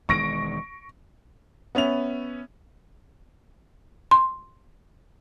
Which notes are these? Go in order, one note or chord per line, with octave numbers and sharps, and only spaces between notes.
E1 D#3 G#3 C#6 A#6 D7
B3 C#4 E5 F7
C6